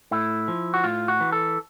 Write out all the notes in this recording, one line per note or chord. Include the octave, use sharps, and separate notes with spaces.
A2 E4
F3
F#4
A2 F4
F#4
E3
A4